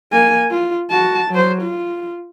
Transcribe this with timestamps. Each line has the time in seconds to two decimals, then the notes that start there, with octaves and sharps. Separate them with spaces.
0.12 A#3 G#5
0.51 F4
0.90 F#4 A5
1.31 F#3 C5
1.62 F4